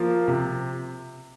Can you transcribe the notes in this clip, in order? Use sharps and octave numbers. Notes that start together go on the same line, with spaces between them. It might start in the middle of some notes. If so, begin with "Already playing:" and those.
Already playing: F3 A#3 F4
C3